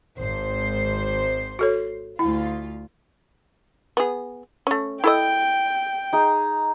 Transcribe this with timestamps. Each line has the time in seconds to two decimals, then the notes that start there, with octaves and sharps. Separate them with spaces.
0.18 G#1 C5 C7
1.59 F#4 A4 C#5
2.19 D2 E4 F4
3.97 B3 G#4
4.67 A3 C#4
5.04 E4 A4 D#5 G5
6.13 D#4 G#4